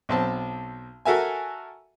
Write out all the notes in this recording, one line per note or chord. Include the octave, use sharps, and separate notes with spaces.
B1 C4 A5
F#4 A4 A#4 E5 G#5